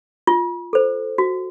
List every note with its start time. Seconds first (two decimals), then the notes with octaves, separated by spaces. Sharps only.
0.27 F4
0.73 A4 C5
1.18 F#4